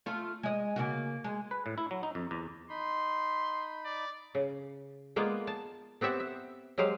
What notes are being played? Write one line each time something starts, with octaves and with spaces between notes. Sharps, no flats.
A3 F4
G#3 D#5
C#3 A#3 F#4
G#3
B4
A2
E4
F#3
D#4
F2
E2
D#4 B5 C6
D5
C#3
G#3 A#3 B3 F4 D5
A5
B3 C4 G4 E5 F#5
E5
F#3 G#3 G4 C5 F5